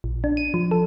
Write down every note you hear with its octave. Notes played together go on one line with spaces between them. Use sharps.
A#1
D4
D#7
F3
A4